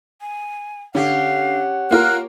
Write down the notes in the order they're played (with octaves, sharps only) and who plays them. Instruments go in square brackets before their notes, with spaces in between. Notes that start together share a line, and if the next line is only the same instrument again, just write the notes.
[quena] G#5
[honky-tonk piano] D3 [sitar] C#4 G4 [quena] F5 [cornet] F#5
[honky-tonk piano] A#3 F4 A#4 [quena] F#6